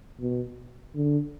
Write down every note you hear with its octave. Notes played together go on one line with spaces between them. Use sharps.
B2
D3